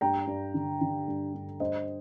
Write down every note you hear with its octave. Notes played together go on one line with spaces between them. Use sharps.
G2 G5 A#5
G2
D3
D3
G2
G2
G2 C5 D#5